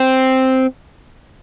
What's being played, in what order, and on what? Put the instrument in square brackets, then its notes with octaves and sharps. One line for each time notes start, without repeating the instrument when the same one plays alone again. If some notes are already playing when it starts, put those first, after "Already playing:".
Already playing: [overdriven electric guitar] C4